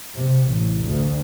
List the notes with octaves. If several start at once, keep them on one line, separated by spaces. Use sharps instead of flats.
C3
A1
D2